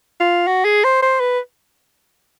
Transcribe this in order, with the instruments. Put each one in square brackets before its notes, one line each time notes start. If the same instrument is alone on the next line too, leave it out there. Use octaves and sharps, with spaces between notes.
[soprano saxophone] F4
F#4
G#4
C5
C5
B4